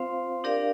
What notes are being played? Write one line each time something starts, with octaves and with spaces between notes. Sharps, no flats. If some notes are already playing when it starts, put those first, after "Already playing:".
Already playing: C4 F4 C5 F5
D4 G4 A#4 D5 F5